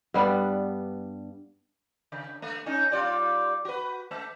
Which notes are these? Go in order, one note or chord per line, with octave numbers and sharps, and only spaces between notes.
G2 G3 B3 D4
C#3
A3
C#4 D#4
G3 F4 D5
F#4 B4
A3